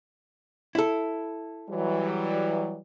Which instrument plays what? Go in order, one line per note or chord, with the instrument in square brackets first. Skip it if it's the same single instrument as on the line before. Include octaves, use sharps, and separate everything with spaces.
[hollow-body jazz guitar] E4 A4
[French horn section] E3 F#3 G3